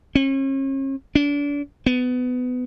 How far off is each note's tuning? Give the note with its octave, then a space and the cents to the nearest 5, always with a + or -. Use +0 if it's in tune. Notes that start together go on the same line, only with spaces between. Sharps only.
C#4 -40
D4 -35
B3 +20